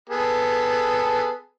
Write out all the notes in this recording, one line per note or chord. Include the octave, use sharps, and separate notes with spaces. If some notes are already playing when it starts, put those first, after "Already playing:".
B3 G#4 A4